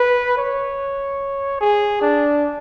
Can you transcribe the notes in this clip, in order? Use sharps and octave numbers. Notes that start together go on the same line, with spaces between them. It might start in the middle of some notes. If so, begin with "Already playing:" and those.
Already playing: B4
C#5
G#4
D4